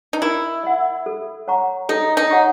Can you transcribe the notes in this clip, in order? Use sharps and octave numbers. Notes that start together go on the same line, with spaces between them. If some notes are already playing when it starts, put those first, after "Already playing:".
D#4
E4 A#4
D#5 F#5
A4
C#5 F#5 A#5 C#6
D#4 A4
D#4
C#5 F#5 A#5 C#6